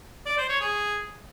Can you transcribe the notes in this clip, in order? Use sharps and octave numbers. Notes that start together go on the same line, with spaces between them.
D5
C5
C#5
G#4